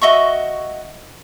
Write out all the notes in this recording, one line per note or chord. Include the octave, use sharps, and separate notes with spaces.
F#4 D#5 E5 C#6